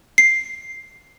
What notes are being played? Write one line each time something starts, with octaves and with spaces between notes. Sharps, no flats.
C7